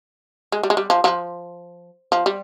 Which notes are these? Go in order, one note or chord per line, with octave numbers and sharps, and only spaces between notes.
G#3
G3
G#3
G3
F3
F3
F3
G3